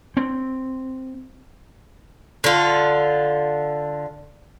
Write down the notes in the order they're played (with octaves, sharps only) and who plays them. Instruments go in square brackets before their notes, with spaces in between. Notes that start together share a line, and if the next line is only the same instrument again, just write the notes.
[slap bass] C4
[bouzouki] D3 F4